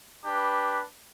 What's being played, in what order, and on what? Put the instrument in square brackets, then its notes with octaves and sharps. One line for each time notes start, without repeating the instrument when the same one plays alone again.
[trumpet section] D4 G4 B4